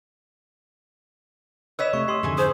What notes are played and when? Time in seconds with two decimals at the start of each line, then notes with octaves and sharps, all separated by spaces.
1.79 B4 C#5 D#5 E6 B6 E7
1.93 C3 A3 E5 C#6
2.08 G4 C6 D#6 C7
2.23 F2 G#2 D3 E3 G#4 G#5
2.38 G#4 C5 D#6